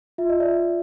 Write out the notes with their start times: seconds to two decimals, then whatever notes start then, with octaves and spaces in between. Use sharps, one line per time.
0.18 F4 E5
0.29 D#5
0.40 F4 D5 E5